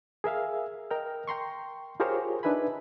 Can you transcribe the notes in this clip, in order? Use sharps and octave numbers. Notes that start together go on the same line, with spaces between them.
G#4 A#4 E5 F5
A#4 D#5 G5 F6
G5 A#5 C6 C#6
F4 G4 G#4 A#4 C5 C#5
D4 D#4 B4 E5 G#5 B5